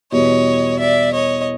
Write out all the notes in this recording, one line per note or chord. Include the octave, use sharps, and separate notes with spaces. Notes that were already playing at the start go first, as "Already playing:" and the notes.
E2 B2 G3 B3 C#5 D#5
D5 E5
C#5 D#5